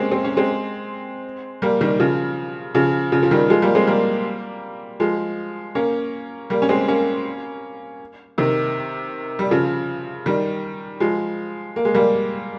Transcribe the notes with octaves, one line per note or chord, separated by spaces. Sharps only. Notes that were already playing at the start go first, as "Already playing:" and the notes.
Already playing: G#3 A#3 C4 C#4
C4
C#4
G#3 C4
G3 A#3
D#3 G3
C#3 F3
C#3 F3
C#3 F3
F3
D#3 G3
F3 G#3
G3 A#3
G#3 C4
G3 A#3
F3 G#3
A#3 C#4
G3 A#3
C#4
G#3 C4
A#3 C#4
C3 D#3
G3
C#3 F3
D#3 G3
F3 G#3
A#3
G#3
G3 A#3